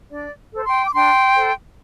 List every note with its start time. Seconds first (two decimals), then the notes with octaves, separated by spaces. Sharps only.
0.11 D4 D5
0.52 A4 C5
0.66 G5 C6
0.85 D6
0.93 D4 G5 C6
1.35 A4 C5